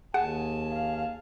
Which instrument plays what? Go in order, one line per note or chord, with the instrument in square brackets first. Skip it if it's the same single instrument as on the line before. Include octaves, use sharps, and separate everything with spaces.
[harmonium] D#2 G#5 A5 [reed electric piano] G#4 [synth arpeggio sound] F#5
[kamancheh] F5